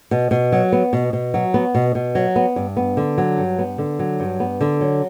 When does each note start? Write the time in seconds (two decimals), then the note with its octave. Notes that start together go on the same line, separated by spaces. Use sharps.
0.11 B2
0.31 B2
0.52 F#3
0.72 B3
0.93 B2
1.13 B2
1.34 F#3
1.54 B3
1.75 B2
1.95 B2
2.15 F#3
2.36 B3
2.56 G2
2.77 B3
2.97 D3
3.18 F#3
3.38 G2
3.59 B3
3.78 D3
3.99 F#3
4.20 G2
4.40 B3
4.61 D3
4.81 F#3